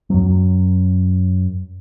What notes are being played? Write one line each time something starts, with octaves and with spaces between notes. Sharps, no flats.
F#2 F#3